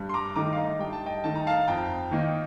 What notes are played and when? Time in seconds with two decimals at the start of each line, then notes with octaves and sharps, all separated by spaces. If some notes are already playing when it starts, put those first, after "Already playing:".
Already playing: G2
0.09 C6
0.14 A#5 D6
0.36 D#3 A3 D#4 A#5 D6
0.53 F5
0.57 D#5
0.79 G2 G5
0.93 A5
1.06 D#5 G5
1.24 D#3 A3 D#4 A5
1.35 A#5
1.47 F5 A5
1.67 F2 G5 A#5
2.11 D#3 A#3 D#4